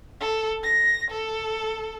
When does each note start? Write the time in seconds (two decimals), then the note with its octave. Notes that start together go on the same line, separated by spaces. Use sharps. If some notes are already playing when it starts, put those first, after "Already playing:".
0.21 A4
0.64 A#6
1.10 A4